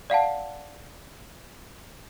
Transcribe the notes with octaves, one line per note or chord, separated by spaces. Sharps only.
D5 F5 F#5 A5